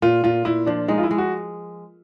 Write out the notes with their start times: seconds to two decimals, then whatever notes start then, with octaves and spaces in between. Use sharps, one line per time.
0.02 A#2 F4
0.24 A#2 F4
0.45 A#2 E4
0.67 F3 D4
0.88 G#3 D#4
0.98 F4
1.03 E4
1.11 G#3
1.18 F#4